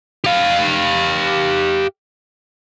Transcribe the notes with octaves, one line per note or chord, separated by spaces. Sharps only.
G4 F5